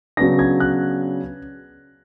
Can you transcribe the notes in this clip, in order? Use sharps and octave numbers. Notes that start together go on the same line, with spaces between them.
C#3 F#3 B3 D4 A#6
G#6
F#6